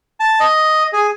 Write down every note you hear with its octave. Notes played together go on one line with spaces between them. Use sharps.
A5
D#5
G#4